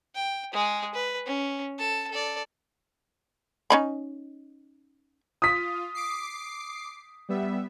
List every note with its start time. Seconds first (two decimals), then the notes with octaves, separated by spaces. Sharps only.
0.15 G5
0.53 G#3 G#4
0.94 B4
1.26 C#4
1.79 A4 A5
2.11 A4 D5
3.70 C#4 D#4 B5
5.42 F4 D#6 B6
5.95 D6 C7
7.29 G3 B3 E5